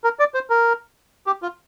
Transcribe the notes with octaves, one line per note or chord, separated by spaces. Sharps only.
A#4
D5
C5
A#4
G4
F4